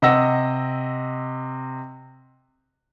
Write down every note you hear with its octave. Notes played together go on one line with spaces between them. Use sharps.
C3 D#5 F#5 E6 A#6